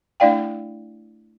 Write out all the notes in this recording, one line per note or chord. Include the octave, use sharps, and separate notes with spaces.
A3 D4 E4 D5 F5 G5